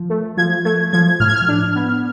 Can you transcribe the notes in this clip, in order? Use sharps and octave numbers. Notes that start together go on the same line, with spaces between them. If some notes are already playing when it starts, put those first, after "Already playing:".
Already playing: F3
A3
F3 G#6
A3 G#6
F3 G#6
A2 F6
G#6
F6
D4
B3